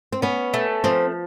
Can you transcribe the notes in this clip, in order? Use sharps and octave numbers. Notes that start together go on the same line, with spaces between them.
C4
B3 C#4
A3
F3 C4